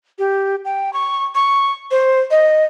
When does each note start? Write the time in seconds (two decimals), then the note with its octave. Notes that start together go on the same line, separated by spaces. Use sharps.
0.19 G4
0.65 G5
0.93 C#6
1.35 C#6
1.91 C5
2.31 D#5